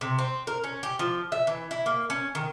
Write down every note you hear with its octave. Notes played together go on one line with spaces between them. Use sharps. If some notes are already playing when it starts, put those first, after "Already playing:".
C3
C4
A#4
C#4
G4
F3
E5
E3
E4
A#3
C#4
D#3